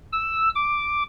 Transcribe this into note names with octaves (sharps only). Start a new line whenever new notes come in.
E6
D6